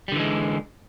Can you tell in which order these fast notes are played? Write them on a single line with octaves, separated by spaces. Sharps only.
G3 D3 E3 G#3